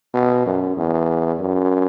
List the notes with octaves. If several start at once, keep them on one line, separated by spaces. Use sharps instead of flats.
B2
F#2
E2
F#2